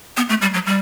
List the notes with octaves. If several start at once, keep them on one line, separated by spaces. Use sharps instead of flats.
B3
A3
G3
F#3
G3